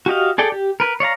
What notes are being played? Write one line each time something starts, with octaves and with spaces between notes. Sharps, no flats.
F#4 G4 D#5 F5
G#4 A4 D5 G5
G4
A#4 B4
C#5 D5 F5 A#5